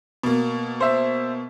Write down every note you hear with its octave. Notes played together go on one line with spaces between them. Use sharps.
B2 A#3
C5 E5